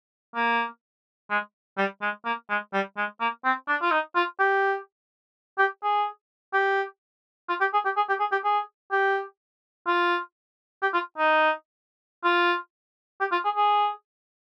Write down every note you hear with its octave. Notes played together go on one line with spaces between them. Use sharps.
A#3
G#3
G3
G#3
A#3
G#3
G3
G#3
A#3
C4
D4
F4
D#4
F4
G4
G4
G#4
G4
F4
G4
G#4
G4
G#4
G4
G#4
G4
G#4
G4
F4
G4
F4
D#4
F4
G4
F4
G#4
G#4